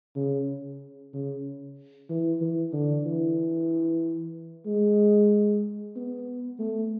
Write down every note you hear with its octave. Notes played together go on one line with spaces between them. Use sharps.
C#3
C#3
E3
E3
D3
E3
G#3
B3
A3